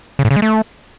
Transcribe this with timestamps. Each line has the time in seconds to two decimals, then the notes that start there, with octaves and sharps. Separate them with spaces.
0.19 C#3
0.25 A2
0.31 C#3
0.36 G#3
0.42 A3